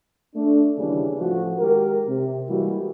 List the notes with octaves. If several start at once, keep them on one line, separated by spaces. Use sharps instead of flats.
A3 D4
D#2 C#3 E3 G3 C#4 D4
A1 F3 A3 F#4
D#3 G#3 G4 A#4
C3
E3 G3 G#3 A#3 F#4